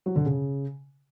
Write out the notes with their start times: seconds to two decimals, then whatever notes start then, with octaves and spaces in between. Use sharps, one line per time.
0.06 F#3
0.16 D3
0.26 C#3